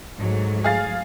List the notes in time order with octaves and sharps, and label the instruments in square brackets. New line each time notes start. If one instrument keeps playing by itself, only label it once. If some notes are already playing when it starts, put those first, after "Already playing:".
[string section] G#2 F#3 A3
[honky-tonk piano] G#4 F5 A6